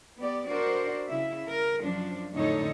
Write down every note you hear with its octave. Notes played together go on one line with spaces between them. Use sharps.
B3 G4 D5
D4 F#4 A#4 C5 D5
C#3 E4 E5
A#4
F#2 F3 D4
F2 A2 D3 D#4 A4 C#5